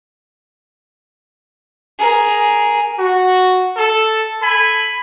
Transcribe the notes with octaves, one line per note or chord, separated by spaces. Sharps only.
G#4 A#4
F#4
A4
A4 G#5 B5